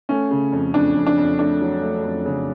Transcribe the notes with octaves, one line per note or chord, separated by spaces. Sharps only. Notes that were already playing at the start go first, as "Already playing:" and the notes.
A3 C#4
C#3
F2
F2 D4
F2
D4
F2
A3 D4
F#3
A3
F2
C#3